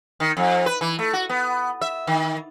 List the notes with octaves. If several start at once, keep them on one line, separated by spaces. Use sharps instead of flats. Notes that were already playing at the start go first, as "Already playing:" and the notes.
D#3
F2
B4
E3
A3
F#4
B3
E5
D#3